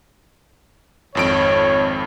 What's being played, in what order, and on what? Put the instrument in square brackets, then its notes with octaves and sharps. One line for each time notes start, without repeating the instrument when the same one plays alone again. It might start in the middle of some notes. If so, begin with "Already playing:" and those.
[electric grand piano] G#1 F2 D7 [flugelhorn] C#5